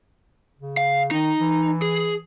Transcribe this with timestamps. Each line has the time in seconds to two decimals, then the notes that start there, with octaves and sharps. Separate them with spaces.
0.58 C#3
0.77 F5
1.11 D#3 D#4
1.40 E3
1.82 G#4